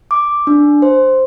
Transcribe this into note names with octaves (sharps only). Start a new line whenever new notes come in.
D6
D4
C5